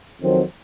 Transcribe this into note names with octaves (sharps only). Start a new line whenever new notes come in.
F2 D#3 F#3 C4